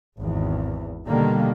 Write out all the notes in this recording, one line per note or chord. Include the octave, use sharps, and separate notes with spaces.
G#1 E2
B2 D3 D#3 G3 A#3